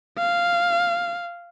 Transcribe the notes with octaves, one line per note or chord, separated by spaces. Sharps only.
F5